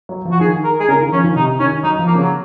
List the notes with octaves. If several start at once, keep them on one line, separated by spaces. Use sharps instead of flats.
F#3
F3
F#4
D#3 G#4
A#4
G#4
C#3 A#4
D#3
F3 C#4
D#3
C3 D#4
D#3 C#4
F#3 D#4
F3
A#3
C#3
F#3